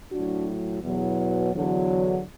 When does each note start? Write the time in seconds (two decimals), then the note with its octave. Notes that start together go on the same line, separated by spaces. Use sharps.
0.11 A2 F#3 D4 F#4
0.82 E2 B2 F#3
1.53 E2 D3 F#3